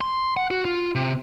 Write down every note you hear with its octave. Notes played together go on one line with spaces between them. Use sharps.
C6
F#5
F#4
F4
C3